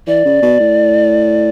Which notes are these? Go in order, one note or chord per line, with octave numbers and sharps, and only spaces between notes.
E3 D5
C#3
B2
A2